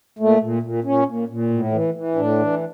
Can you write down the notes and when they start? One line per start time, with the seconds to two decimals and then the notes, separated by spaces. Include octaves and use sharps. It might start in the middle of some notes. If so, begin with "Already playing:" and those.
0.19 A#2 A3
0.40 A#2
0.63 A#2
0.84 A#2 C#4
1.06 A#2
1.29 A#2
1.50 A2
1.72 E3
1.94 E3
2.15 A2 D4
2.38 E3